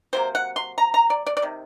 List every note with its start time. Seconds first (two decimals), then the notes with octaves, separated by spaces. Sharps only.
0.13 C3 F#3 A#3 C5
0.35 F#5
0.56 C6
0.78 A#5
0.94 A#5
1.10 D5
1.27 D5
1.37 D5
1.42 C3 D#3